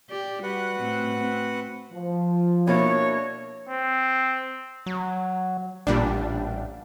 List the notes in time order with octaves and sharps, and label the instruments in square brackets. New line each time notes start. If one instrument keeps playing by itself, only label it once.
[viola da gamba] G4 [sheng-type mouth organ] D5
[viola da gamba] G3 [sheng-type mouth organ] F#4 B4 F#5
[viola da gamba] A2 C4
C4
[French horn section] F3
[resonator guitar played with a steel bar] B2 A#3 E4 [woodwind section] D4 F#4 C#5
[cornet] C4
[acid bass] F#3
[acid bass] A1 [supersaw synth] A#2 G3 D4